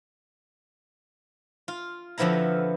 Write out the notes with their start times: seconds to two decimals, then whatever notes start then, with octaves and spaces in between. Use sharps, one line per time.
1.68 F4
2.18 F2 D3 F3 B3 E4 A#5